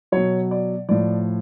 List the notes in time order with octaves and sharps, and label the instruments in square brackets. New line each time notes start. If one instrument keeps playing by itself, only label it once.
[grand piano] B2 F#3 C#5
D5
A2 F3 D5